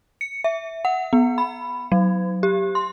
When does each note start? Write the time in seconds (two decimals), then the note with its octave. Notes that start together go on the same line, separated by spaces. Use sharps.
0.21 C#7
0.44 E5
0.85 F#5
1.13 B3
1.38 B5
1.92 F#3
2.43 G4
2.75 C6